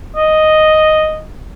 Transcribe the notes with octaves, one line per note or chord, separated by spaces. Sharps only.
D#5